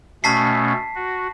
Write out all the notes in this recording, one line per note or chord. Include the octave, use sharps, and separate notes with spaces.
B2 A3 C#4 A5 B6 C7
F#4